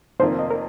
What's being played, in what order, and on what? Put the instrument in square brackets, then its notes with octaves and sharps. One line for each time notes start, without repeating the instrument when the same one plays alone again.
[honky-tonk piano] F1 F2 D#3 A#3 F4 [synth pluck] C5
[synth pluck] D#5
A#4